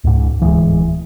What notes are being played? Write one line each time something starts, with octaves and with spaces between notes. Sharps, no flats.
C#2 G#2
D1 E3 G3 G#3